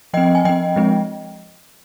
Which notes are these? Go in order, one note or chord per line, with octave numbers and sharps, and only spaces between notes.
F3 C4 D#5 G5
G#5
F3 C4 D#5 G5
F3 G#3 C4